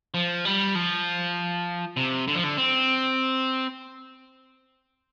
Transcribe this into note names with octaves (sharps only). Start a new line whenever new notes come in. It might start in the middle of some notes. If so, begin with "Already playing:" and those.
F3
G3
F3
C3
D3
F3
D3
C4